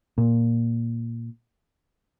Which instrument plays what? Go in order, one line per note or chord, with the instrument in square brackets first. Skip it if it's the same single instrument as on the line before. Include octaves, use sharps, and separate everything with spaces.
[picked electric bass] A#2